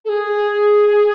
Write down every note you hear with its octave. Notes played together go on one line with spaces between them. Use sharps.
A4
G#4